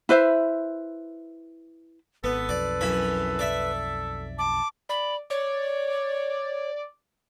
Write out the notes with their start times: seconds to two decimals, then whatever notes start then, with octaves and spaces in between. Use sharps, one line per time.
0.09 E4 B4 C5 E5
2.24 G#1 B3 A4 B4
2.49 B1 F2 D5
2.81 F#2 E3 B5
3.39 D5 E5
4.38 A5 D6
4.89 D5 B5
5.30 C#5 D5